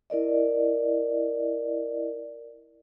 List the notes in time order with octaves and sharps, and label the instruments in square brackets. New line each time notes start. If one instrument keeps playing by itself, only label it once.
[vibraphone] E4 A#4 D5 D#5